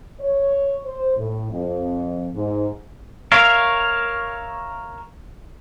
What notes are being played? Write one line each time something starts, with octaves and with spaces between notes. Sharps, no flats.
C#5
C5
A2
F2
G#2
A#4 C#5 E5 F5